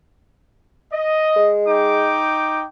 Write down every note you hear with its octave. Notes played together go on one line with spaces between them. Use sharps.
D#5
G#3
D#4 G5 D6